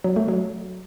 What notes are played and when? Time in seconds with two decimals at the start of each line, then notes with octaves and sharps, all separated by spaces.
0.04 F#3
0.16 A3
0.28 F#3